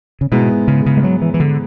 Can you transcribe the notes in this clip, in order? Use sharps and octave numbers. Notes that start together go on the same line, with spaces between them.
C#3
G#2 B2 G#3 B3 E4
C#3
C#3
G#3
F#3
E3
E3
D3